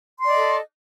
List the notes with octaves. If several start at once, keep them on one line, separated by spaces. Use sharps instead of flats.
A4 D5 D#5 C6